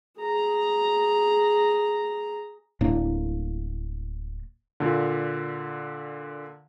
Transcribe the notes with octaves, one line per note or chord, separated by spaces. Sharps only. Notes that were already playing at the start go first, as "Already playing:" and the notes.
G#4 A#5
D1 A2 A#3 D4
A#2 D3